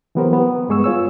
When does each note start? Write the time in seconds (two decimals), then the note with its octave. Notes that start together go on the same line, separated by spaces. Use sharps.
0.15 E3 F#3 B3 G4 A#4 C5
0.33 B3
0.69 G2 G#3 G#4 C#6 E6
0.84 F4 C#5 E6